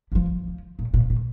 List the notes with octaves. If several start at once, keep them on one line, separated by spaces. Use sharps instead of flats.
G3
F3
F3
A#2
A#2
A#2